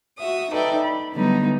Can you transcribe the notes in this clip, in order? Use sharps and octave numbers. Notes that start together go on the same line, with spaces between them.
F#4 E5 D#6
D#4 A4 B4 D5 E5 G5
B5
D3 F#3 G3 A3 B3 D#4